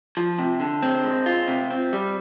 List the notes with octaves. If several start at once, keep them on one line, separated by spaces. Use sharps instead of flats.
F3
C3
D3
C4
G#3
F4
C3
C4
G3